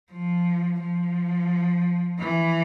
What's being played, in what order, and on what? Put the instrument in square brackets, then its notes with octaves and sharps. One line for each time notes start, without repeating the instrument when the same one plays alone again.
[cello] F3
F3
E3